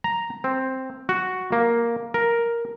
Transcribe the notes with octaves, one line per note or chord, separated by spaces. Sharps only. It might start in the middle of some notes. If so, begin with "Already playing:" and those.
A#5
C4
F#4
A#3
A#4